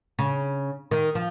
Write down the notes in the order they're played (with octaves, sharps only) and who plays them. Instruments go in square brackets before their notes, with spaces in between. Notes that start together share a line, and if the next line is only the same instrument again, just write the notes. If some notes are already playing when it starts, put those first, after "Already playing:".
[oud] C#3
D#3
F3